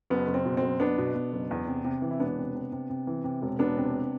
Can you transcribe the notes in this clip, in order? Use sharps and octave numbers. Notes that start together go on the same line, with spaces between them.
F#1 B3
F#1
C4
B2
C4
F#1
F#1 B3 D4
B2
B2
F#1
E2
C3
C3
E3
E4
E1 B3 D4
C3
C3
C3
C3
E3
C3
E1
E1 B3 D4
C3